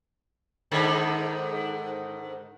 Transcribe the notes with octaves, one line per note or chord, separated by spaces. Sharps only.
G#2 D3 D#3